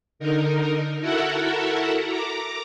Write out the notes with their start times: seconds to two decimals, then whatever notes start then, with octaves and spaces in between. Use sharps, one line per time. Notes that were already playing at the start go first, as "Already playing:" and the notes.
0.19 D3 D#4 A#4
1.00 E4 F#4 A4 A#4 E5 F#5
2.05 A#5 D6